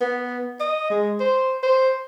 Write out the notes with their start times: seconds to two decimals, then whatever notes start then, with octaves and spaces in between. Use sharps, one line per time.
0.01 B3
0.61 D#5
0.91 G#3
1.20 C5
1.63 C5